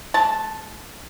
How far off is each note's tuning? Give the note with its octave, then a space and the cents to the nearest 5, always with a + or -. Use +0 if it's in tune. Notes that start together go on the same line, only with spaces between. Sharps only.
G#3 +45 A5 +0